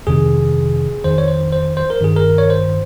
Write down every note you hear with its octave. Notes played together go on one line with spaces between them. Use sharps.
F2 C3 D#3 G#4
F2 D#3 C5
C#5
C5
C5
C5
A#4
G2 D#3 G#4
A#4
C#5
C5